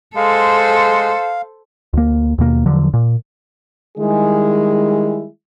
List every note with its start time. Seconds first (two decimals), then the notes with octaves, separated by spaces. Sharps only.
0.16 G#3 A4 C5 F5
1.93 D2 A#3
2.38 D#2 B2 A#3
2.66 E2 D3 F3 F#3
2.94 A#2
3.98 D#3 G3 G#3 E4 G#4